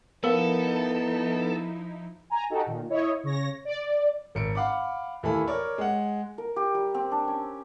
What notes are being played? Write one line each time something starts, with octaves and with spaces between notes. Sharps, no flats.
F3 B3 D#4 E4 A4 A#4 F5
G#5 A#5
D#4 F#4 G4 A4
A#2 D#3
E4 C#5 D#5
C#3 C#5 A#6
D5
G#1 C#7 D7
F5 F#5 B5 D6
D#2 E3 A3 A4 B5
A#4 C#5 D5
G#3 F#5
A#4
G4
G3
C4
D4
C#4